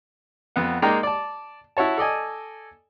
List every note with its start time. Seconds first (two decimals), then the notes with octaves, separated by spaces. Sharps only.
0.56 F2 B3 F#5
0.82 G#3 A#3 D#4 D5 G5 A#5
1.03 D5 A5
1.77 E4 F#4 C#5 A5
1.97 A4 D5 D#5 G#5